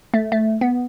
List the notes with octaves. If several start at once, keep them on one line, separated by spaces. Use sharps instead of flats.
A3
A3
B3